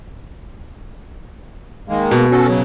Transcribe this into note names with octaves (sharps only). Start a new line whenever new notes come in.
D#3 G#3 A#3
B2
C#4 F#4 A4
C#3 F#3